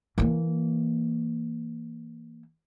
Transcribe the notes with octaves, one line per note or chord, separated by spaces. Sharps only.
E3 A#3